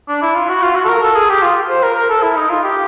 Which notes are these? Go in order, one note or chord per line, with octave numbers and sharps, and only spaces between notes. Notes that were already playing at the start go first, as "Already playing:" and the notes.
D4
E4
F4
F#4
F4
F#4
A4
A#4
A4
G#4
G4
F4
C5
A#4
A#4
A4
E4
D#4
F4
G4